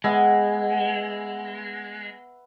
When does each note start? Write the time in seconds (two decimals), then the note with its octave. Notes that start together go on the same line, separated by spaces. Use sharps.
0.04 G#3 B3 E5 F#5